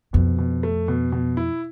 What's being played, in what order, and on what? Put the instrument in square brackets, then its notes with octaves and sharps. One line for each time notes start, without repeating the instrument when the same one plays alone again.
[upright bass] F2 [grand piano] B2
[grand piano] B2
A3
B2
B2
E4